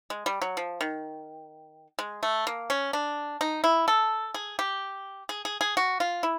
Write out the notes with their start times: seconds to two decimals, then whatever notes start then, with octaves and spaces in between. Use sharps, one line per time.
0.10 G#3
0.26 G3
0.42 F#3
0.57 F3
0.81 D#3
1.99 G#3
2.23 A3
2.47 A#3
2.70 C#4
2.93 D4
3.41 D#4
3.64 E4
3.88 A4
4.34 G#4
4.59 G4
5.29 G#4
5.45 G#4
5.61 G#4
5.77 F#4
6.00 F4
6.23 E4